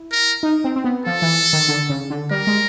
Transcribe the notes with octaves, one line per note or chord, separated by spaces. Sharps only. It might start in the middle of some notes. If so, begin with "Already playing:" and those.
Already playing: E4
A#4
D#4
C4
C4
B3
F3 A4
E3
D#3
D3
C#3
D3
G3 A#4
G#3